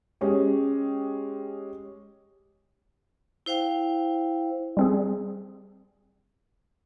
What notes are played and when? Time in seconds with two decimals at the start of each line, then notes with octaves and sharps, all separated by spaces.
0.21 G#3 C#4 G4
3.46 E4 C5 F5 G5
4.77 G3 C4 G#4